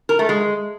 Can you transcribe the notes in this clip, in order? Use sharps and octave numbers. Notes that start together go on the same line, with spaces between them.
A#4
A3
G#3